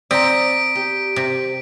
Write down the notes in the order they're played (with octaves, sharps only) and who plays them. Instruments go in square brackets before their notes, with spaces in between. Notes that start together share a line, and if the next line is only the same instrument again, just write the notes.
[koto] C4 [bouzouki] D5 [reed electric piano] A#5 D#6 [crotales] B6 D7
[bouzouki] G4
[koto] C3